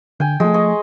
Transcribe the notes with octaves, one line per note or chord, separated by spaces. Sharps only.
D3 G5 G#5
F3 G#3 A3
D#5 C#6